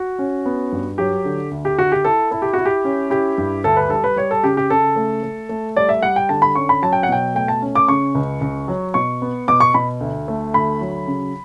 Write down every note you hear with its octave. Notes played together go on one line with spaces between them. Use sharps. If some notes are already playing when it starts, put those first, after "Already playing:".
Already playing: F#4
C#4
B3
G2
F#3 G4
D3
D2
G4
D2 F#4
G4
E4 A4
E4 A4
G4
E4 F#4
G4
C#4
E4 G4
G2
D2 A4
B4
G3 A4
B4
G3 C#5
A4
C#3 G4
G4
C#3 A4
A3
A3
A3
G3 D5
E5
G3 F#5
G5
D3 A5
B5
C#4 C#6
B5
F#3 A5
G5
F#5
B2 G5
A3 G5
A5
C#4
D6
C#3 C#6
C#2
C#2
F#3
B2 C#6
B3
B2 D6
C#6
B2 B5
D2
A3
D2 B5
F#3
C#3